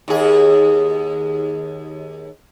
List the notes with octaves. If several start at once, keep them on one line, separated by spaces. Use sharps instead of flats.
D#2 G#4